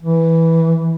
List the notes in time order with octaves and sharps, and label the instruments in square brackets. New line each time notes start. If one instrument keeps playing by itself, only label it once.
[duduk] E3